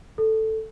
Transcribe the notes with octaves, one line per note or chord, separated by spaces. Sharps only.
A4